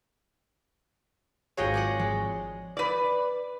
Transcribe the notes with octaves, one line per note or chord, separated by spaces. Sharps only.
G#1 F#3 F4 F#4 G#4 C#5 D#5 G5
D5 D#5 F#5
F3 G#3
B4 D5